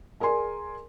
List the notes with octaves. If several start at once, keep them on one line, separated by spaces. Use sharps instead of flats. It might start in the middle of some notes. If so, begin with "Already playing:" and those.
G#4 A#4 D5 G#5 C6